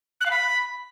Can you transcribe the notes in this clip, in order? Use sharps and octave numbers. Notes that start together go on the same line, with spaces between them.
F#6
F5
B5